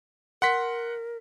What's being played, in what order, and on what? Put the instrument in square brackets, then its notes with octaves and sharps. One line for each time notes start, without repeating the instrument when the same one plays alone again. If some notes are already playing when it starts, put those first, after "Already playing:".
[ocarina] A#4 [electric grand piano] F#5 C6 B6